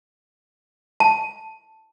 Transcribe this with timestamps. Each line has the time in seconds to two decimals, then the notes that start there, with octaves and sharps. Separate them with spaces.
1.00 A5